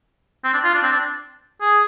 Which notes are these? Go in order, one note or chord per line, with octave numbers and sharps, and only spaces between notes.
C4
D4
F4
D4
C4
D4
G#4